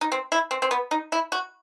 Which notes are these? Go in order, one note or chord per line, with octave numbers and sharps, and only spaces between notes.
D#4
C4
E4
C4
C4
B3
D#4
E4
F#4